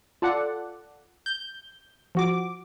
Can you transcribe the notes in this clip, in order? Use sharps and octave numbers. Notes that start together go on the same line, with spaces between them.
F4 A4 D5 F#5
G6
F3 F#4 D6